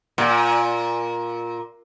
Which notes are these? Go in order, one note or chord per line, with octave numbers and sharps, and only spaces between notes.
A#2